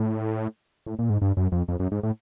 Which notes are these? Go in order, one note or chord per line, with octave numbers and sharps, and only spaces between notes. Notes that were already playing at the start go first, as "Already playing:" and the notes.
Already playing: A2
A2
A#2
G#2
G2
F#2
F2
F2
F#2
G#2
A2